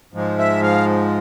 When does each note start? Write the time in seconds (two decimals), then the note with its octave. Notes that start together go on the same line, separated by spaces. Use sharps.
0.13 G#2 F3 G#3
0.38 E5
0.63 F5